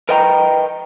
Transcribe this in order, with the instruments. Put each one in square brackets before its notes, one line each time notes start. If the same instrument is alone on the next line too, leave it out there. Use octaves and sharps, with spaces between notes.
[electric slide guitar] A#4 B4 D#5 G5 A5 A#5